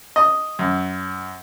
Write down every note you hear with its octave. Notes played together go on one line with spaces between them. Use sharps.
D#5
F#2